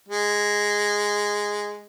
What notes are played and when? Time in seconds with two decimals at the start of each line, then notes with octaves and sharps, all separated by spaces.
0.08 G#3